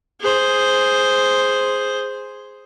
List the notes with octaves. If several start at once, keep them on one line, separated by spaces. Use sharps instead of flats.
G#4 C5